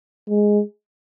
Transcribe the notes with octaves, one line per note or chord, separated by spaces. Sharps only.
G#3